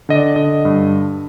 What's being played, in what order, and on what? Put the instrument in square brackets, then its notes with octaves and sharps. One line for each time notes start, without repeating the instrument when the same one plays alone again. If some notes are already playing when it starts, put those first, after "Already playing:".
[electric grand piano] D3 D#5
D5
D3 D#5
G2